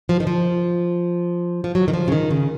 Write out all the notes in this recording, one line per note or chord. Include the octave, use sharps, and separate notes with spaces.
F3
D#3
F3
F3
F#3
D#3
F3
C#3
D#3
C#3